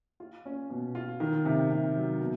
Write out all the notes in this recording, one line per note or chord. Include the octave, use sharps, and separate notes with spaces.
F4
C#4
B2
F4
D#3
C3
C3
F#3
B2